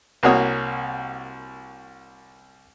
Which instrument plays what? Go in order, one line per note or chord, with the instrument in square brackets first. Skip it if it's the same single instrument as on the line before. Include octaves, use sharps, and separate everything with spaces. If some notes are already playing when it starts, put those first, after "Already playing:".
[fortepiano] C2 A#3 F#4 C#5 D#6